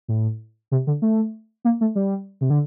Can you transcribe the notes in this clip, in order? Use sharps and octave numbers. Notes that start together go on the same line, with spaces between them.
A2
C3
D3
A3
A#3
A3
G3
C3
D3